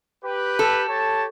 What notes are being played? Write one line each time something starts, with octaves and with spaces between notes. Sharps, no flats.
G4 B4
A4
G4 C#5 A5